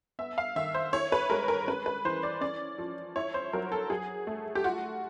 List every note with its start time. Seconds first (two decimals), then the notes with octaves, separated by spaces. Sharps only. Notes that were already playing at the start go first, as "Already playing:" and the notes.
0.19 B3 E5
0.38 F5
0.56 D#3 E5
0.74 C5
0.93 E4 C#5
1.12 B4
1.30 G#3 A#4
1.48 A#4
1.68 C#4 B4
1.86 B4
2.05 E3 C5
2.23 D5
2.41 C#4 D5
2.78 F3
3.16 E4 C#5
3.34 C5
3.53 F#3 A#4
3.72 A4
3.90 F#3 G#4
4.27 A3
4.55 G4
4.64 F4 F#4